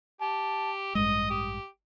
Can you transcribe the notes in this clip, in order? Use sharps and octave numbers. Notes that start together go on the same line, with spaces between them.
G4 A5
A1 G2 G#3 D#5 D#6
G4